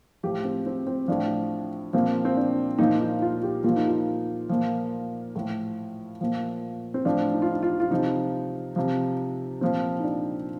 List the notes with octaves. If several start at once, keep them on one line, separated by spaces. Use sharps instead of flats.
A2 F3 G4
C4
C4
C4
A2 F3 D4
A#2 F3 C4
C4
D4
A#2 F3 D#4
D#4
F4
G4
A#2 F3 F4
D#4
F4
A#2 F3
A2 F3
A#2 F3
C4
A2 F3 D4
D#4
F4
D#4
F4
F4
C3 F3 D#4
C3 F3
A#2 F3 C4
D#4
D4